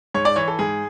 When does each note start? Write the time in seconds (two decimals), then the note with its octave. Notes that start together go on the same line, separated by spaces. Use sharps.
0.15 G#2 C#5
0.25 D5
0.36 E3 C#5
0.48 A4
0.59 G#2 G#4